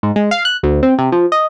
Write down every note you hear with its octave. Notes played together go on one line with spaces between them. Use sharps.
G#2
G#3
F5
F#6
D2
C4
C3
F3
D#5